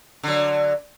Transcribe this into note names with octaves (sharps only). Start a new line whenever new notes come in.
D3 F#3